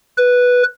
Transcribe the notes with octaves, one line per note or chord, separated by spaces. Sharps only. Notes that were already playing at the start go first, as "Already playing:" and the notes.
B4